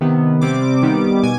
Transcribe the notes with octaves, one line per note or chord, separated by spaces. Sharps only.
C3 D#3 B3
C3 G3 C4 D6
D#3 G3 B3
B2 G#5